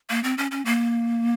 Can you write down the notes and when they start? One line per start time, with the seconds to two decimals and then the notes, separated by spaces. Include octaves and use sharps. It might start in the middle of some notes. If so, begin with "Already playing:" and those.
0.10 A#3
0.23 C4
0.38 C#4
0.51 C#4
0.65 A#3